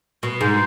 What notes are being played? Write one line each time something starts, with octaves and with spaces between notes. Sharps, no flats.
B2
G#2